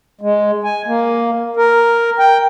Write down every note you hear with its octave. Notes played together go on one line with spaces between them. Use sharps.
G#3
G#5
A#3
A#4
G5